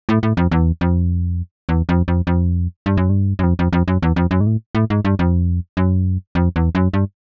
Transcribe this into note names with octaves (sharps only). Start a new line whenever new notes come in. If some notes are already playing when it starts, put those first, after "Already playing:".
A2
A2
F2
E2
F2
E2
F2
F2
F2
G2
F#2
G2
F#2
F2
F2
F2
F#2
E2
F2
F#2
G#2
A2
A2
G#2
G2
F2
F#2
F2
E2
F#2
G2